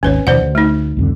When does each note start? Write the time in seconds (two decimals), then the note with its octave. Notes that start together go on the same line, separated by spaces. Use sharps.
0.03 G#1 D#2 C#4 B4 C#5
0.27 D#2 B2 F3 C5 D5 F#5
0.41 D2
0.55 A3 D#4
0.97 C2 F2 D3